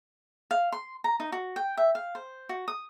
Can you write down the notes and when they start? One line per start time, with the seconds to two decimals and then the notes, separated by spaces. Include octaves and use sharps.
0.51 F5
0.72 C6
1.04 A#5
1.20 D#4
1.32 F#4
1.56 G5
1.77 E5
1.95 F5
2.15 C5
2.49 F#4
2.68 D#6